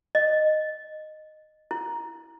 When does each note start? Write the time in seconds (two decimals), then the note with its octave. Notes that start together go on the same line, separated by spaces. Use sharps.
0.15 D#5
1.71 E4